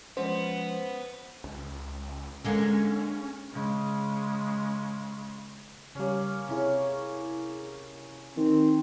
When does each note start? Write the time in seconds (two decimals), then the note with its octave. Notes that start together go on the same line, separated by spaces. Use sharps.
0.17 F3 G#3 B3 C#4 C5
1.44 C#2
2.44 D3 G#3 A#3 C#4
3.53 C#3 G#3
5.95 C#3 G3 A#3 C#4
6.49 C3 C#4 E4 G#4 C#5
8.37 D#3 C4